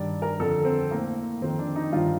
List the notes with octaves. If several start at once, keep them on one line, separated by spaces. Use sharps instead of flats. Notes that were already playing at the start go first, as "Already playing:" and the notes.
Already playing: G2 D#3 D5
A#4
F2 D3 A4
C4
A2 A#3
F2 D#3 C4
D4
D#4
G2 D#3 F4